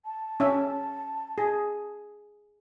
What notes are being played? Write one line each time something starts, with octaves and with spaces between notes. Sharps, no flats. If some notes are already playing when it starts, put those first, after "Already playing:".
A5
C#4 E5
G#4